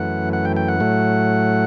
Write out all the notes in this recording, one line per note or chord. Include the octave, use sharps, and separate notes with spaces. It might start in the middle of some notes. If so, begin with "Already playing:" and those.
Already playing: F#2 E3 A3 F#5
F#5
G5
G5
F#5
A2 F#3 A3